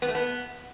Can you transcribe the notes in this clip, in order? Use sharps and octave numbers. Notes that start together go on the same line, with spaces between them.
B3
A3
B3